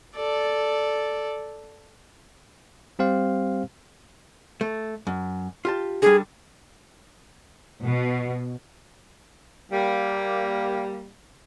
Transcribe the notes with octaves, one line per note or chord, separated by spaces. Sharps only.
A4 D5
G3 C4 G4 C5 F5
A3
F#2
F4 G4 A5
D3 G3 G#4
B2
G3 A#3